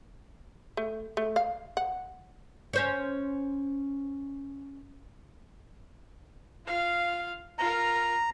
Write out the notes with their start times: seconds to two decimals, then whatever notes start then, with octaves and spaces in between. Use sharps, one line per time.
0.77 A3
1.17 A3
1.36 F5
1.77 F#5
2.73 C#4 C5 C#5
6.66 F4 F5
7.59 F4 A#4 A#5